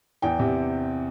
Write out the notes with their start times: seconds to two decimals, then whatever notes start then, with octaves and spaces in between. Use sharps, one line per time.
0.22 E2 G5
0.39 C3